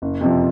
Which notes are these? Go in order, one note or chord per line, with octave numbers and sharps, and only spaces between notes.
F#1
F2 C3 F3